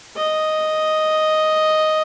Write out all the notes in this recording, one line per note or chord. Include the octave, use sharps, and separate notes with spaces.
D#5